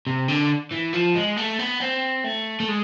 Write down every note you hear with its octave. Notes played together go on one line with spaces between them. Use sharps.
C3
D3
E3
F3
G#3
A3
B3
C4
A3
A3
G#3